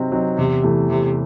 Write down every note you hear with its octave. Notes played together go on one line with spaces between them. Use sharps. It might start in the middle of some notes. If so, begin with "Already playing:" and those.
Already playing: C3 F#3 C4 D#4
F#3 C4 D#4
E2 C3
C3 E3 A3
E2 C3